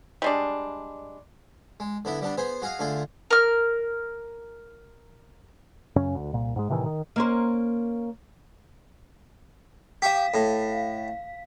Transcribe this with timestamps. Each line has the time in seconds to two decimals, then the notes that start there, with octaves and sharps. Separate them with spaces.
0.22 G3 G#3 D4
1.80 G#3
2.05 D3 B3 E4
2.21 G3 B3 D4
2.38 B3 G#4 C5
2.62 F#4 G#4 D#5 F5
2.79 D3 A3 F4 G#4
3.31 A#4 F6
5.96 F#2 C#3 C#4
6.15 D2
6.33 C2 A#2
6.56 G#2 G#3
6.70 A2 C3 D#3 E3
6.86 D#3
7.16 A#3 C#4 C5
10.02 G4 F5 C#6 B6
10.34 A2